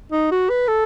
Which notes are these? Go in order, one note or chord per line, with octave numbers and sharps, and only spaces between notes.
D#4
F#4
B4
A4